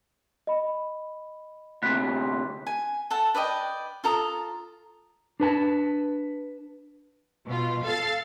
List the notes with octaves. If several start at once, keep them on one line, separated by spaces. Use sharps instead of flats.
D#5 B5
D2 C3 B5 F#6 B6
G#5
A4 F#5 A5
B4 D5 D#5 G5
F4 A4 A#5 D#6
D4 B4 A5
B2 F4
A4 F5 A6 C7